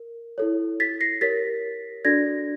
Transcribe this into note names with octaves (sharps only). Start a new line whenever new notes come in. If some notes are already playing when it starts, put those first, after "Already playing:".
Already playing: A#4
E4 A4 C#5
A6 B6
A#6 C7
G4 A#4 C#5 A6 B6
D4 F#4 A4 D5 G#6 A#6